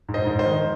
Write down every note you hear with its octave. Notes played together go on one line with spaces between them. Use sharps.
G#2
C5 D#5
G#2
C5 D#5
D#3